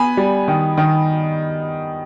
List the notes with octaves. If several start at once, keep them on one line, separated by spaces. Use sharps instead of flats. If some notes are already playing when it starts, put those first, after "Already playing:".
Already playing: B3 G#5 B5
G3
D#3
D#3